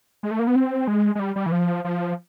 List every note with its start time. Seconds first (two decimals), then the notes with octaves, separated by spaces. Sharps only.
0.23 G#3
0.31 A3
0.39 A#3
0.47 B3
0.56 C4
0.88 G#3
1.15 G#3
1.20 G3
1.36 G3
1.46 E3
1.52 F3
1.85 F3